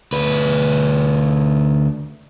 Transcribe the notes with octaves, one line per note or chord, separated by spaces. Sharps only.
D2 B4